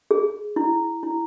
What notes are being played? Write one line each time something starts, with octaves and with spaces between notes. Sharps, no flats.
G#4
E4
E4